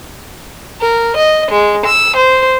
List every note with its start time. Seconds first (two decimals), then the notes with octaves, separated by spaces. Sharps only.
0.82 A#4
1.17 D#5
1.51 G#3
1.86 E6
2.18 C5